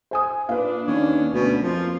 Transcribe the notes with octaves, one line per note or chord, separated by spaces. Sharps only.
C5 G#5 D#6
A#2 D4 B4 F5
D#2 C#4
D2 B2 C#4
F2 F3 A#3 F4